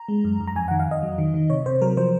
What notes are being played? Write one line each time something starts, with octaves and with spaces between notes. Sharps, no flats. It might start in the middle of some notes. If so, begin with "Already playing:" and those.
Already playing: A#5
G#3
F#2
F#2
A#5
F2 G#5
D#3 F#5
F5
F2 D#5
F#3
D#3
D#3
C3 C#5
C3 C5
F#3 A#4
F3 C5